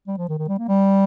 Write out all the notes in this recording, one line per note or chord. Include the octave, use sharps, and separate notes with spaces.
G3
F3
D#3
D#3
G3
A#3
G3